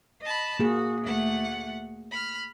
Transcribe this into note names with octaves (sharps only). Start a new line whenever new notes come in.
D#5 A5 B5
A#3 F#4 G#4
D2 A3 F#5
B5 F6